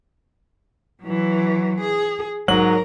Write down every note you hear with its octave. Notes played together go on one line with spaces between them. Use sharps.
E3 F#3
G#4
G#2 F#3 A#4 F#7